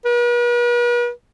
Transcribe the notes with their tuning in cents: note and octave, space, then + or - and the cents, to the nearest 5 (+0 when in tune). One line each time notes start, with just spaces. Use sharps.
B4 -45